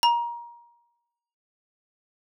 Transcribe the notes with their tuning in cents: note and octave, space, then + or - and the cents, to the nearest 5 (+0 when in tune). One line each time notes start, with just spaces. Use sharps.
A#5 +25